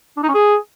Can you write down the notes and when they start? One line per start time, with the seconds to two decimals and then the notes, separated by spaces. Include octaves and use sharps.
0.17 D4
0.23 D#4
0.29 C#4
0.35 G#4